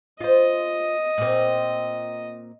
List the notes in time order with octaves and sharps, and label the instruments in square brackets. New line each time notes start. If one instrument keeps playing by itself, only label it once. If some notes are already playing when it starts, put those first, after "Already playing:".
[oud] F4 C5 [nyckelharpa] D#5
[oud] A#2 C4